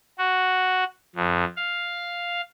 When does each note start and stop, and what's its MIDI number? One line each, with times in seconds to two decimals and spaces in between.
0.18 0.84 66
1.16 1.45 41
1.57 2.41 77